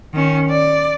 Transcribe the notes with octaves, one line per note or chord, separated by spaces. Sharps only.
D#3 C#4
D5